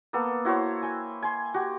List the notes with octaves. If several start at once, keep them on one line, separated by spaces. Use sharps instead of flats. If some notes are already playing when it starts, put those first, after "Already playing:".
A#3 B3 A4
E4 F#4 C5 C#5
G5 G#5
G#5 C6
F#4 G4